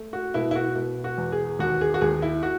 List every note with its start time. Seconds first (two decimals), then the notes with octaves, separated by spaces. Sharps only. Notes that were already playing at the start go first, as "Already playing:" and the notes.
Already playing: A3
0.13 F#4
0.34 B2 E4
0.51 E4
0.56 F#4
0.76 B2
1.04 F#4
1.18 E2
1.32 G#4
1.59 D#2 F#4
1.81 G#4
1.94 F#4
2.01 D#2 G#4
2.22 E4
2.43 F#4